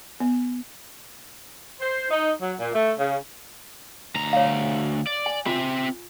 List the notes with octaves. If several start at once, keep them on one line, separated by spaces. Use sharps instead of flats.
B3
C5
D#4
F#3
A#2
A3
C#3
D2 A#5
C#5 F5
D5
G#5
C4 F4 E5